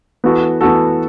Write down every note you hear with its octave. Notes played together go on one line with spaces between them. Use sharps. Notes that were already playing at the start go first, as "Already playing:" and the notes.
E3 B3 F#4 A4
E3 B3 F#4 A4